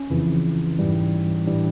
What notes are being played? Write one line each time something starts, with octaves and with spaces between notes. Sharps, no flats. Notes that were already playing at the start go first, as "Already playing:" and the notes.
Already playing: C#4
F2 C#3 E3
G#2 E3 G3
A2 E3 G3 D4